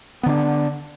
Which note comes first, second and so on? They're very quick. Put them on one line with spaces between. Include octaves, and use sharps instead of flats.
B3 D3 D4